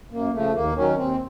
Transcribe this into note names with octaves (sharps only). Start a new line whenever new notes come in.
F#2 A#3
C#3 F3 A3
D#2 A#3
D#3 F#3 C#4
D#2 C4